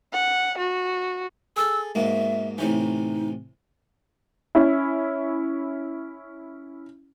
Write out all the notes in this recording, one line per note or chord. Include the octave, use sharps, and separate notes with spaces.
F#5
F#4
G#4 A4 E6
G#2 B2 A#3 E5
A2 C3 E3 D#4
C#4 E4